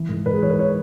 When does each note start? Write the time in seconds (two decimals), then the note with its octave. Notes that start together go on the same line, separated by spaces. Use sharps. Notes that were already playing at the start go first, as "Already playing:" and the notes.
Already playing: E3
0.09 G#2
0.26 G#2 B4
0.34 G#4
0.42 E3 C#5
0.50 B4
0.59 C#5